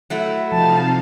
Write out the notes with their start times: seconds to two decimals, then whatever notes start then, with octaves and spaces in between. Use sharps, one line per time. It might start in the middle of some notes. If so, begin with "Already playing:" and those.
0.10 F#3 A3 E4
0.52 C3 F3 D#4 F5 A5